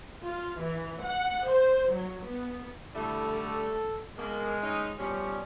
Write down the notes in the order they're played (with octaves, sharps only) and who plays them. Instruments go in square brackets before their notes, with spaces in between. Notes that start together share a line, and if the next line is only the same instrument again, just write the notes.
[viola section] F4
E3
F#5
C5
F#3
B3
[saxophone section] D3 G3 A3 [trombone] E4
[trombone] A4
[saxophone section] B2 D#3 A#3 [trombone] G#3
[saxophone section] C#4 D#4
[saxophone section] B2 F3 C#4 [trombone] G3